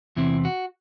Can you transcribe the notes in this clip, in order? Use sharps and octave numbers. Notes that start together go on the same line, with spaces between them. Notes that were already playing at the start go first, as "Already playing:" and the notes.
E2 C3 E3 C4 E4
F#4